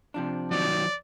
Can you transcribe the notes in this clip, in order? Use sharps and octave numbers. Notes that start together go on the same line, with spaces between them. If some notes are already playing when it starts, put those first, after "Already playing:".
C3 F3 D4
D#3 F#3 D5